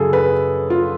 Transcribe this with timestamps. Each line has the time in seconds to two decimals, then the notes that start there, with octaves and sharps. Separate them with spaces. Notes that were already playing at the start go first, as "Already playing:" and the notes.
Already playing: F#2 C#3 F#3 G#4 A4
0.13 B4
0.70 F4